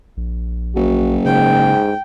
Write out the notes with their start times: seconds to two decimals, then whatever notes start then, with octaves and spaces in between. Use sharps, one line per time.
0.17 A#1
0.75 F#1 F#4
1.25 G#2 C#3 G5